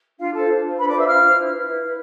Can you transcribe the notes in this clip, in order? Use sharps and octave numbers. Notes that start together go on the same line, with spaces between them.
D4 F4 F5
F4 A4 C5 A5
D4
F4 C5
D4 B4 B5
D5 D6
F4 C5 E5 E6
D4 F5 F6
F4 C5
E4
B4
E4
B4